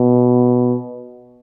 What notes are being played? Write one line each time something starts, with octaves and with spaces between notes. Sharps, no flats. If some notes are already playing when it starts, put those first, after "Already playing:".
Already playing: B2